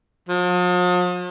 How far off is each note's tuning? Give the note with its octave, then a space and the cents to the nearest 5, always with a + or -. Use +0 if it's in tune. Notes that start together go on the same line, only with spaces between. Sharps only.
F3 +45